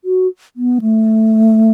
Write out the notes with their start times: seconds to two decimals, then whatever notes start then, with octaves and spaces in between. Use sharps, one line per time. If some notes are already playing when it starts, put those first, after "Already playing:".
0.05 F#4
0.56 B3
0.81 A3